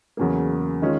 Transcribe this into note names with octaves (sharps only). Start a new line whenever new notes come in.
E2 C#3 F#3 A#3
D#3 G#3 C#4 F4